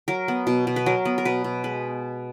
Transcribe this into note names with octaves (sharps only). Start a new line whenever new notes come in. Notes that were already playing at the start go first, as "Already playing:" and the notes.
F#3 A#4
B3
B2
B2
B4
F#3 A#4
B3
A#4
B2 B4
B2
G#3 B4